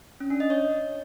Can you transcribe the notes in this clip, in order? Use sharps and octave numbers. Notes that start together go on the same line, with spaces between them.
C#4
D4
D#5
C#5